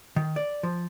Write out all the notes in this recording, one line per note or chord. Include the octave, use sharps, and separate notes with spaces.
D#3
D5
F3